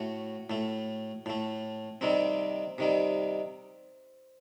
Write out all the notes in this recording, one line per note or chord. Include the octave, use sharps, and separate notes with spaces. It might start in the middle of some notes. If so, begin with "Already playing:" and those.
Already playing: A2 A3 F#4
A2 A3
A2 A3
C3 D#3 G3 C4
C3 D#3 G3